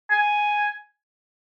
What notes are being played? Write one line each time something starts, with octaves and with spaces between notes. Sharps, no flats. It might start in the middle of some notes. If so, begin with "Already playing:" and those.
G#5